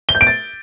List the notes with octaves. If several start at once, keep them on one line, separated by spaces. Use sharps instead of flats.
G7
G6
D7
A6